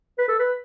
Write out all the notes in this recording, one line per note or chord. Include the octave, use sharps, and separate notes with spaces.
B4
A4
B4